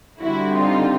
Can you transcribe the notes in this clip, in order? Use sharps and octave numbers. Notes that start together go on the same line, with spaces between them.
D3 G3 C4 E4 F#4
D#4 F4